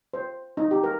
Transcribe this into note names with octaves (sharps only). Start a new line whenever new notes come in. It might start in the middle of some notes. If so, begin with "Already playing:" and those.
C5
D#4
G4
A#4